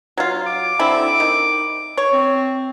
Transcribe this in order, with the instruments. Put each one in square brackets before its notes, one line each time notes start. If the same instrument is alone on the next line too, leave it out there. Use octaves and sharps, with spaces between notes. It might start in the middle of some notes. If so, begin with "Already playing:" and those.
[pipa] F#3 F4
[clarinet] D6
[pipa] D3 C4 E4
D#3
C#5
[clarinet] C4